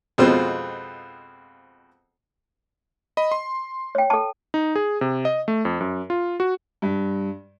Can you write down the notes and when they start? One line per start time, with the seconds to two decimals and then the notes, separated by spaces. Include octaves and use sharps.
0.18 F2 B2 G#3 C4 F4
3.17 D#5 B5
3.32 C6
3.95 C#5 G5
4.10 A4 A5
4.54 D#4
4.76 G#4
5.01 C3
5.25 D#5
5.48 A3
5.65 F2
5.80 F#2
6.10 F4
6.40 F#4
6.82 G2